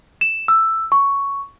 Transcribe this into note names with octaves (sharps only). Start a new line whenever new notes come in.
E7
E6
C#6